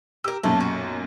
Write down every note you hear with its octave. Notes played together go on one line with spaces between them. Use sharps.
G4 A#4 E6
B1 F#2 A#2 A3
F#4